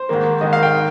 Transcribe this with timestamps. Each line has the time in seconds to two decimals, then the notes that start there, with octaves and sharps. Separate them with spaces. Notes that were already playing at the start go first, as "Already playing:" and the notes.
Already playing: C5
0.09 G#2 D#3 A#3
0.41 G#2 D#3 A#3 D#5
0.53 F5
0.63 G5
0.75 D#3